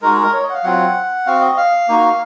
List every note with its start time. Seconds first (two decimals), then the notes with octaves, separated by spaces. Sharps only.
0.02 G#3 D#4 F#4 A#4
0.12 G#4
0.23 A#4
0.33 C#5
0.43 D#5
0.50 F#5
0.54 F5
0.64 F#3 C4 F4 F#5
1.26 C4 F#4 F5
1.41 D#5
1.57 F5
1.88 A#3 D#4 F#4